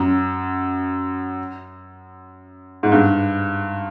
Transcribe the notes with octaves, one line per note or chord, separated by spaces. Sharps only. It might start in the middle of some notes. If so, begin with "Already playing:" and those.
Already playing: F#2
G#2
G2